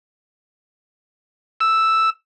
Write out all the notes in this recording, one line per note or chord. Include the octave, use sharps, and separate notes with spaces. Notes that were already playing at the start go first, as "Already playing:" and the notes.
E6